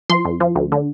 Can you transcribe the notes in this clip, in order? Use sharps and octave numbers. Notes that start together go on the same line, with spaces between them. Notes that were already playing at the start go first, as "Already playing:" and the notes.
F3 C6
F2
F3
D2
D3